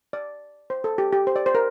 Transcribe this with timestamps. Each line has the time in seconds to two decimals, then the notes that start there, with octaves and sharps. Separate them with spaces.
0.13 D5
0.70 C5
0.84 A4
0.98 G4
1.13 G4
1.27 C5
1.36 D5
1.46 C5
1.55 A#4